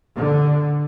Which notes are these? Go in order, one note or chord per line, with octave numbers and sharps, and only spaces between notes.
D3